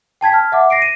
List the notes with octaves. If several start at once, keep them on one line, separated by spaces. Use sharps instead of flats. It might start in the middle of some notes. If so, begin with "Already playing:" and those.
G5 A5 G#6 B6
A5 F6
E5 F#5 D6
A#6 C7 D7
D#7